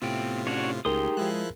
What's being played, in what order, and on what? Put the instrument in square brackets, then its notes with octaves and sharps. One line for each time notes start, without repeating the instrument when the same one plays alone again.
[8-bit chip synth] A2 C3 F4 [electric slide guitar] B3 E5 G5
[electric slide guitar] C#4 D4 [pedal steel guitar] F#4 C#5
[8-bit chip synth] C#2 [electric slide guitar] A2 D#4 [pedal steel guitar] G4 C6 D#6 [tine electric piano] G#4 A#4
[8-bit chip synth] F3 E4 F#6 [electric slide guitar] G#3